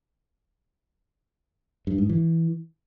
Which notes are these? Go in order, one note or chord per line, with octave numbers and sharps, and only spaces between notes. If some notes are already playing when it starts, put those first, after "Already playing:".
G2
G#2
E3